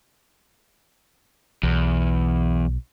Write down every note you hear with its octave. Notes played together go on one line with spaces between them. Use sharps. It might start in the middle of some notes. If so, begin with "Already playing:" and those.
B1 E2